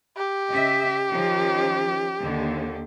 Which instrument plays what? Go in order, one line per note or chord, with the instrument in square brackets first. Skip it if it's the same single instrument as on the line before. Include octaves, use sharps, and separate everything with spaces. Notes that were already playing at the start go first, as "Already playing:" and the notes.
[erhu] G4
[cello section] C#3 D#5 E5
D#3 F3 C#4
D#2 D3